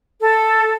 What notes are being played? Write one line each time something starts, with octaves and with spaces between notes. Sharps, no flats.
A4